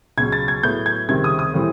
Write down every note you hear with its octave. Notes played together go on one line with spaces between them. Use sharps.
C#2 B2 F#3 G#6
A6
G#6
A2 F#3 B3 G6
G#6
C#2 C3 D#3 G3 C4 G#6
D#6
D#6
A2 E3 G3 C4